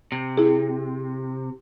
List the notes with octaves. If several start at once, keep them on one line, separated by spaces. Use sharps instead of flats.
C3
E4 G#4